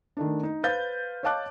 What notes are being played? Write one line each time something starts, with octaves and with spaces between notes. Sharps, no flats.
D#3 A3 D4
D#4
B4 C5 F5 G6 A6
C#5 D#5 F5 A5 D6 F#6